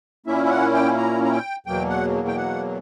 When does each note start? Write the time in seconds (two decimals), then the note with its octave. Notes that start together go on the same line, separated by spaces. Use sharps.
0.26 A#2 A#3 C#4 E4 E5
0.45 E5
0.50 F#5
0.74 G5
0.97 A#5
1.24 A#5
1.31 G5
1.66 E2 B2 F#3 A#3 G5
1.89 F#5
2.28 G5
2.37 F#5